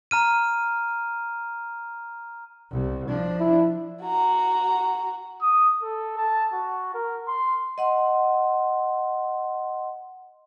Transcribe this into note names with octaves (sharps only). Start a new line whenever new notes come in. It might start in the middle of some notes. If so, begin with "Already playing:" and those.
A#5 F6 D#7
C2
F3 D4
E4
F#4 A#5
D#6
A4
A5
F#4
A#4
C6
D#5 F#5 C6